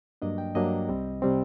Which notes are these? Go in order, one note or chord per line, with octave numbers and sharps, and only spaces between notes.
G2 F#3 A#3 D4 D#5
G5
G2 F#3 A#3 D4 D#5
C2 C3 G3 C4
C3 G3 C4